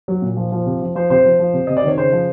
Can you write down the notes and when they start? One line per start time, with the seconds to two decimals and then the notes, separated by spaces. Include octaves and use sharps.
0.08 F#3
0.22 A#2
0.37 F3
0.52 F3
0.66 C3
0.81 F3
0.95 F3 C5
1.10 C3 C5
1.25 F3
1.39 F3
1.53 C3
1.67 C3 D#5
1.77 D5
1.84 D#3 C#5
1.97 C#3 C5
2.13 F3